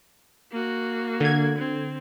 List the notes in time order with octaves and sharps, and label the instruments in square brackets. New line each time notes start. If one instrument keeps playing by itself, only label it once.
[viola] A#3 F#4
[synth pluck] D3 G#6
[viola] C4